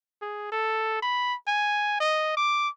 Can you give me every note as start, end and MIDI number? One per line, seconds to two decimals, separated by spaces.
0.22 0.48 68
0.52 1.00 69
1.03 1.35 83
1.48 2.00 80
2.01 2.35 75
2.37 2.69 86